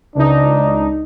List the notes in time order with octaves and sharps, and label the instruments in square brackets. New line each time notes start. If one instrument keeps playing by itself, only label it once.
[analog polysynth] C#2 D#4 [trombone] D4